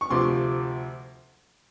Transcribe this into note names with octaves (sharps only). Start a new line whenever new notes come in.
C#6
D2 C3 F3 C6 D6